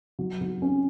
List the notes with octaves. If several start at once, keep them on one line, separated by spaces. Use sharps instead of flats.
F#3
F#3
C#4